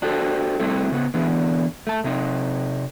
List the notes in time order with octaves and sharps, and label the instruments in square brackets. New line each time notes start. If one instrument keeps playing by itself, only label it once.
[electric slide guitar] D4 F#4 G4 A4 C5
G3 A3 C4 E4 A4
C#3 B3
D3 E3 B3
A3 A5
C3 C4 D#4